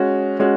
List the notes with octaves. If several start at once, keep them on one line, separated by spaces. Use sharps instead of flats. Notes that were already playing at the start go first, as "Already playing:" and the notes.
Already playing: G#3 C#4 F#4
G#3 C#4 F#4